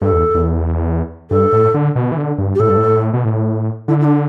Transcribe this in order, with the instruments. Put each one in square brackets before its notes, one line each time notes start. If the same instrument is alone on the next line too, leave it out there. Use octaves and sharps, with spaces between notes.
[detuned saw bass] G2 [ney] A4
[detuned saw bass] E2
E2
[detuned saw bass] G2 [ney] A4
[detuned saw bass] A2
D3
B2
E3
D3
G2
[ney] G4
[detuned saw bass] A2 [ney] A4
[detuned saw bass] G2
A2
B2
A2
[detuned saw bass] D3 [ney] E4
[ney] E4
D4